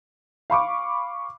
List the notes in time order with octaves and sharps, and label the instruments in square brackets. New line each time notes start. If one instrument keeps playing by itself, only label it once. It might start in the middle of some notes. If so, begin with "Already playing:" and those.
[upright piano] F5 B5 C#6 D6